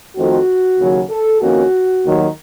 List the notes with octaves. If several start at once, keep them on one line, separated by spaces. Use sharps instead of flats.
F2 D#3 A3 C4 F#4
D#2 C#3 F#3
A4
F2 D#3 A#3 C#4 F#4
D#2 D#3 F#3